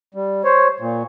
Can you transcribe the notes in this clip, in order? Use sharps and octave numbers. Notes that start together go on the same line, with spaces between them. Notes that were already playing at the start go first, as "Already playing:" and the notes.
G3
C5 C#5
A#2